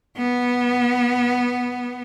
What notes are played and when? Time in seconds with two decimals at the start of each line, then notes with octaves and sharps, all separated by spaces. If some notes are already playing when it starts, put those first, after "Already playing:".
0.17 B3